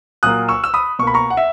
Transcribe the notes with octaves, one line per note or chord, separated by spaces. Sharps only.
A#2 F#3 A#3 D#6 F#6
C#6 E6
E6
B5 D#6
B2 A#3 C#6
B5
A#5 C#6
F#5
E5